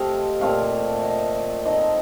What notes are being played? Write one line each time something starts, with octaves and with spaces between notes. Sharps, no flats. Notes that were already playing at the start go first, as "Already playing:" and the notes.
Already playing: C3 F3 A3 C4 D#5 F5
A#2 A3 C4 F5
D#5
F3 C4 D#4 D#5